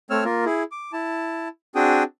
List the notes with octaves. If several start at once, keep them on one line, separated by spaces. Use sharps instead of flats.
A3 C4 C#5 E6 F6
A#3 F4 A#4
E4 G#4
D6
E4 A5
C4 D4 F#4 G#4 G5 D#6